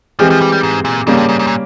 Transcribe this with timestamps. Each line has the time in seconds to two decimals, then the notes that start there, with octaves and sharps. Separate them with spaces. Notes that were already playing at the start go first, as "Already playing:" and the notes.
0.19 E3 F3 G#3 C4 G4
0.30 F3
0.41 G3
0.52 G3
0.63 G#2
0.85 A#2
1.07 G#2 C#3 G3 A#3 C#4
1.17 G2
1.29 G#2
1.39 G#2
1.47 A#2